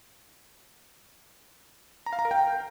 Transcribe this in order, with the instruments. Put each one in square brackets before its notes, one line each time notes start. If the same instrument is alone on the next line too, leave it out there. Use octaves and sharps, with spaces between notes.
[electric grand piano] A#5
F5
A#5
A#4
G5